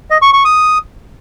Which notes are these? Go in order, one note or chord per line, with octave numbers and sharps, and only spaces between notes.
D#5
C#6
C#6
D#6